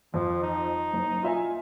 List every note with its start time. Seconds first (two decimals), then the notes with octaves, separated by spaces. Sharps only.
0.14 F2 F3
0.43 D#4
0.93 F#1
1.23 F4 E5 G#5